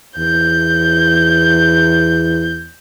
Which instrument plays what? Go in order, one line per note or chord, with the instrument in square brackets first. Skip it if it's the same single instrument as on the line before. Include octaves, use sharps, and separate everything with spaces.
[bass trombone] E2 [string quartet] G6